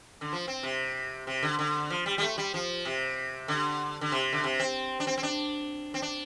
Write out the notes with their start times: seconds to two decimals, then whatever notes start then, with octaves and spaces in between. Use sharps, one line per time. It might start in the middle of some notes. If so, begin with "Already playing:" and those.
0.21 D3
0.33 F3
0.48 C4
0.63 C3
1.27 C3
1.43 D3
1.59 D3
1.90 F3
2.06 G3
2.18 G3
2.22 A3
2.38 G3
2.54 F3
2.85 C3
3.48 D3
4.01 D3
4.12 C3
4.33 D3
4.44 C3
4.59 C4
5.00 D4
5.07 C4
5.18 C4
5.23 D4
5.94 C4
6.02 D4